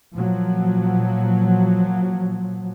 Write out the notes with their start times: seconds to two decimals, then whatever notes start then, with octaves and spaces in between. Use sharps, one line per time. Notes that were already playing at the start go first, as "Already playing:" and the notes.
0.14 A#2 F3 F#3